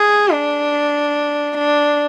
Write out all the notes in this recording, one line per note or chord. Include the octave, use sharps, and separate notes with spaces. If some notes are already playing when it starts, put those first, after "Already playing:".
Already playing: G#4
D4
D4